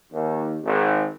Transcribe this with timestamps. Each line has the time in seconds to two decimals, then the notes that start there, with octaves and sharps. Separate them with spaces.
0.12 D#2
0.63 G#1